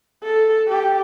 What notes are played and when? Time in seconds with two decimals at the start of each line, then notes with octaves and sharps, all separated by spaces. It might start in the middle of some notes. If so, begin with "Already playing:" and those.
0.23 A4
0.68 G4